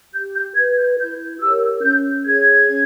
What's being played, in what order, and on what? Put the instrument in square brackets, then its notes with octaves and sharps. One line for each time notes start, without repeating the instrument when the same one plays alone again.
[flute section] G4 G6
G6
B4 G#6
G6
E4 G6
G4 A#4 C#5 E6
C#4 G6
G#4 C#5 G#6
C#4